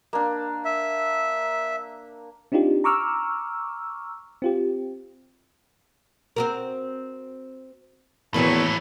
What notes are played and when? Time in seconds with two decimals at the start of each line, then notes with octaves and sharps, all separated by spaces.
0.13 A#3 D4
0.65 E5
2.52 C4 D4 D#4 F4 G4
2.84 A#5 C#6 D6 E6 F6
4.42 C4 F4 G4
6.36 C4 F#4 A#4
8.34 E2 A2 D#3 E3 F#3 A#3 B4 C#5